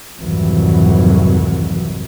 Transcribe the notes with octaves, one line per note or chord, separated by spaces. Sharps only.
C2 F2 G#2 D#3 E3 F#3